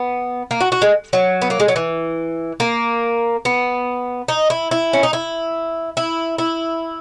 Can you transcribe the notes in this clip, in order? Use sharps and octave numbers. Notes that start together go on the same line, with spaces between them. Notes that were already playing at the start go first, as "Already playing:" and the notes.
Already playing: B3
A#3
F#4
F#4
G#3
F#3
B3
A#3
G#3
F#3
E3
A#3
B3
D#4
E4
E4
C#4
D#4
E4
E4
E4